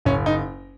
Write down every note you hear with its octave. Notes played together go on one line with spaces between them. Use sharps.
F#1 C#4
D#4